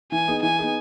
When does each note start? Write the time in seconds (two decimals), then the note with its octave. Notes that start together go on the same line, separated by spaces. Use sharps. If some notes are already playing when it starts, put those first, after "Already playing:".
0.12 E3 G#5
0.28 B3 D#4 G#4
0.43 E3 G#5
0.59 B3 D#4 G#4